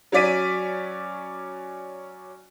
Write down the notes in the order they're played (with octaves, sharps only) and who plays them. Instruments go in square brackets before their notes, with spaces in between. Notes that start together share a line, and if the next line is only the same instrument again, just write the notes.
[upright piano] F#3 C#4 D5 B6 D#7